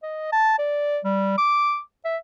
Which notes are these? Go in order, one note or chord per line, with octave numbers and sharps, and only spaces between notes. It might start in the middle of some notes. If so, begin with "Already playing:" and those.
D#5
A5
D5
G3
D6
E5